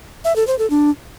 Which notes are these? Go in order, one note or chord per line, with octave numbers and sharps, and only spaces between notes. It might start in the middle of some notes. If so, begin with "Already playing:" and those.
E5
A4
C5
A4
D4